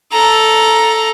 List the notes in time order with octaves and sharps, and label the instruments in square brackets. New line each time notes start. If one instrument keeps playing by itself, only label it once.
[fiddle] A4 A#5